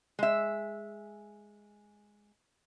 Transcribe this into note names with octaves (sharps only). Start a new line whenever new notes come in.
G#3 E5